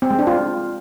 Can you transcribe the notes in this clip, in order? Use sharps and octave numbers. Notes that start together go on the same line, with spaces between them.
C4
G#3
D4
F4